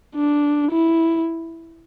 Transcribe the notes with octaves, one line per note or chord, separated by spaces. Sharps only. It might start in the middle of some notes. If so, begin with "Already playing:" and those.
D4
E4